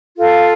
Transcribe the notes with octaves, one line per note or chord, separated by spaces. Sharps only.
F4 A4 F5